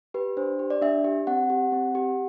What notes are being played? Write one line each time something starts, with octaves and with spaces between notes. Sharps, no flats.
G4 B4
D4 C5
G4
D5
D4 E5
G4
C4 F#5
G4
C4
G4